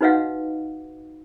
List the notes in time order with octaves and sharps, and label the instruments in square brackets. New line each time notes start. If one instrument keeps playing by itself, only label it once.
[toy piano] D#4 F#4 B4 D#5 F5 F#5